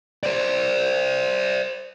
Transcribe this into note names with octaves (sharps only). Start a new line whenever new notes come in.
C5 D5